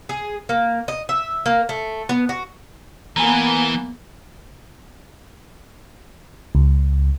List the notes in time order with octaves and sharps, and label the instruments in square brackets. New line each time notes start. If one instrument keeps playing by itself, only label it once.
[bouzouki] G#4
A#3
D#5
E5
A#3
A3
B3
F#4
[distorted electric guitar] E3 [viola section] A#3 B3 [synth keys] G#5 A#5
[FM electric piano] C#2